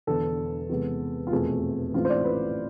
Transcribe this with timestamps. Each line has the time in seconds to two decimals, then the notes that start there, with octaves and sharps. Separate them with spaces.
0.07 E1 E2 D3 A4
0.69 E2 C3 G#3 B3
1.27 F4
1.31 F1 E2 B2 A3 C4 G#4
1.94 A1 G#2 E3 A3 C4 F4
2.05 C5
2.09 D5
2.24 B4